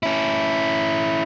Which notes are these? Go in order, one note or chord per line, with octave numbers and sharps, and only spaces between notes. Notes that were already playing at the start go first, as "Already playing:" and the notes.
C#4 E4